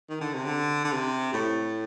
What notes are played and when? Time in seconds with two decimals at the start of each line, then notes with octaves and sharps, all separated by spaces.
0.09 D#3
0.21 D3
0.34 C3
0.45 D3
0.84 D3
0.92 C3
1.33 A2